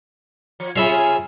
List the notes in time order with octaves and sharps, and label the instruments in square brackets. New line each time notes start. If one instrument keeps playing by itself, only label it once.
[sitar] F3
[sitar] C3 C#4 G#4 [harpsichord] F4 E5 B5